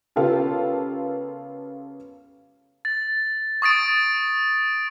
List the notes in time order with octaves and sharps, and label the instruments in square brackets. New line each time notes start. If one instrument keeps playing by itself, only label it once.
[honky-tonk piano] C#3 B3 F4 G4 A4 A#4
[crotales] A6
C#6 D#6 A6 D7